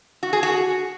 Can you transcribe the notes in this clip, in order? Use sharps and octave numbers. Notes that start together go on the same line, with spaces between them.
F#4
G#4
F#4